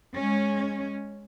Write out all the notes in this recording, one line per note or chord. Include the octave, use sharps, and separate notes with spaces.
G#3 C#4